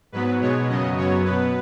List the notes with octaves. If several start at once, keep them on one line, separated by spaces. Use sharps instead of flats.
G#2 F#3 B3 B4
B2 G#3 B3 C#5
F#2 C#3 F#3 B3 D#5
F#2 F#3 B3 C#5
B2 B3 B4